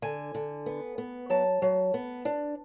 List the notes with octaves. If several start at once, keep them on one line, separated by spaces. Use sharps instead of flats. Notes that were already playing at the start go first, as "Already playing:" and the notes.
D3 G#5
D3
B3
B3
F#3 A5
F#3
B3
D4